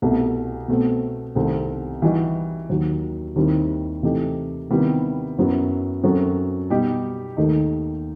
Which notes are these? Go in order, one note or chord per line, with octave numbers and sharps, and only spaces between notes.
C2 B2 A3
B2 A3 C4
C2 C3 D#3 A3 C4
E3 G3 D#4 F#4
D#2 D#3 F#3
D#2 D#3 G3 C4 E4
C3 E3 A3 D#4 G4
C3 D#3 G3 B3 E4
F#2 F#3 B3 E4
F#2 F#3 C4 F#4 A4
B2 G3 D#4 G4
D#2 D#3 A3 D#4